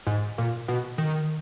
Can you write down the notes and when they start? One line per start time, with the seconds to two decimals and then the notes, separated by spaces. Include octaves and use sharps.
0.07 G#2
0.38 A#2
0.68 B2
0.98 D#3